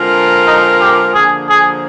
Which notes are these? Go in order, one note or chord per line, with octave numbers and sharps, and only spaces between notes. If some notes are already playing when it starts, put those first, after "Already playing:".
Already playing: D3 G#3 C4 F4 A#4
D#4
G4
D3 F3 A#3 G#4
G#4